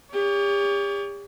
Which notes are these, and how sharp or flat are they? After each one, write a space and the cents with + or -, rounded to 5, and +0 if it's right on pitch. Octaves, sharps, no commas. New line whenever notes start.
G4 +40 C#5 +40